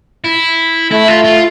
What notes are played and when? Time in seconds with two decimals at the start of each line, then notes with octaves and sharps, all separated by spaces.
0.24 E4
0.91 A3 E4
1.08 F4
1.24 F4